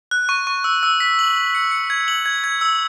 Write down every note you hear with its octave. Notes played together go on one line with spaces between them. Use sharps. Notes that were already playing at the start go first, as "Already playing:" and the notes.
F#6
C#6
C#6
E6
E6
B6
F#7
F#7
C#7
C#7
G#6
F#7
G#6
G#6
E6